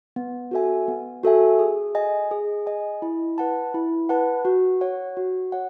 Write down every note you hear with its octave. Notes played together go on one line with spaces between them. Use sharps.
B3
F#4 A4 E5 G#5
B3
F#4 A4 E5 G#5
G#4
D#5 G#5
G#4
D#5 G#5
E4
B4 F#5 A5
E4
B4 F#5 A5
F#4
C#5 F#5
F#4
C#5 F#5